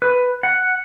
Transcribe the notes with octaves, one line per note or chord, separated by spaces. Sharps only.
B4
F#5